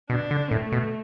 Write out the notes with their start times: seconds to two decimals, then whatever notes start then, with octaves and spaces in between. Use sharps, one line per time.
0.10 B2 D4
0.31 D3
0.51 A2 A3
0.72 B2